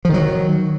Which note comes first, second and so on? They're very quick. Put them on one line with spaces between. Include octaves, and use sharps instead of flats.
F3 D#3 F#3